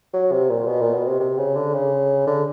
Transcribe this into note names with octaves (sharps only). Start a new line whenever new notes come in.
F#3
C3
A#2
B2
A#2
B2
C3
C3
C#3
D3
C#3
D3